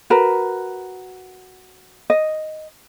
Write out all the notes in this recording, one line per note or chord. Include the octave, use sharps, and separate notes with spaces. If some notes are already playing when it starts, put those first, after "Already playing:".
F#4 A#4 B4 A#5
D#5